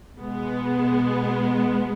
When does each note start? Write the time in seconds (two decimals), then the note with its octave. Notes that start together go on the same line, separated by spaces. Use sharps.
0.17 B2 G#3 B3